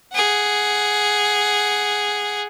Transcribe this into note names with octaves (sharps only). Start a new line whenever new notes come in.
G#4 F#5